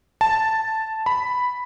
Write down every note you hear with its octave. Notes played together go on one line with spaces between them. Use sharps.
A5
B5